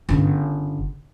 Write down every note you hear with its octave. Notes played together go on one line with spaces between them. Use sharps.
G1 C#3